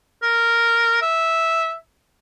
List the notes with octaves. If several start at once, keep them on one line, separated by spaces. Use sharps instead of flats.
A#4
E5